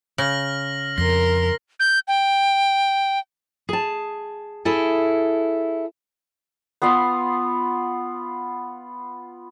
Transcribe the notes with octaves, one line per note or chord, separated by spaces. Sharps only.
C#3 F6 A#6 F#7
F2 A#4 C6 A#6
G6
G5
G#4 A5
E4 G#4 A4
B3 F4 B4 F5